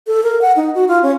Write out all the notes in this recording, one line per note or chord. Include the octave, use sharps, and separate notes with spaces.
A4
A#4
F#5
D#4
F#4
F4
C#4